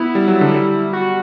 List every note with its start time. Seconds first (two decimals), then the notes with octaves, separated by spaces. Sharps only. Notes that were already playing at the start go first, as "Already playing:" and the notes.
Already playing: B3 E4
0.15 G3
0.28 F#3
0.41 D3
0.54 G3
0.93 F#4